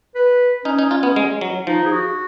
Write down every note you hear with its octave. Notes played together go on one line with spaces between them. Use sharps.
B4
C#4 D#4
D#4
F4
B3
G#3
F#3
F3 D#4
G#4
F#4